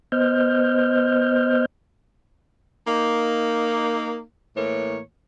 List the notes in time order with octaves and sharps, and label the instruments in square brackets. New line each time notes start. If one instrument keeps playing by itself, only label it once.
[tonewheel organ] B3 C5 D#5 F6 G6
[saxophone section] A#3 D#4
A2 E3 A#3 C#5